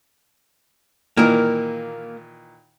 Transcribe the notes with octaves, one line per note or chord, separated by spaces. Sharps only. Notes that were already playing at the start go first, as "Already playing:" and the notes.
A#2 D#3 E3 A#3 A#4